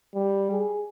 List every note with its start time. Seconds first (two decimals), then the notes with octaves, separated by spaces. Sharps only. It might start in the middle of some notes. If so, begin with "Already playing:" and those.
0.15 G3
0.52 G#4